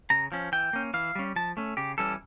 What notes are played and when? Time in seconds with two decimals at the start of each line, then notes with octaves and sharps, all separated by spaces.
0.10 C#3 A#5
0.32 F3 C#4
0.52 E3 G5
0.73 A#3 C#4
0.94 E3 F5
1.15 G3 C#4
1.36 F3 A5
1.57 A3 C#4
1.77 C#3 G4
1.98 E3 G3 C#4 A4